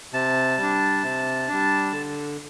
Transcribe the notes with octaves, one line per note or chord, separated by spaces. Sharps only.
C3 A5
G3 D4
C3
G3 D4
D3